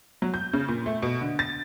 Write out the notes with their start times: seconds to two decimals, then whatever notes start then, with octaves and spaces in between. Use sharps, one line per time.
0.22 F#3
0.34 G6
0.53 C#3
0.68 A#2
0.86 A3
1.02 B2
1.21 D3
1.39 A6